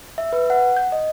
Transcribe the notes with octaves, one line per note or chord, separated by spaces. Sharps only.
E5
B4
F#5
G6
D#5